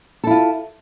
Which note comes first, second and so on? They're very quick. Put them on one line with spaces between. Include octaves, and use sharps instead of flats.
A4 E4 F4